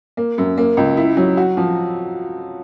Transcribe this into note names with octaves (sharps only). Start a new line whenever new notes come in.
A#3
F#2
A#3
C#2
E4
F#3
F#4
F3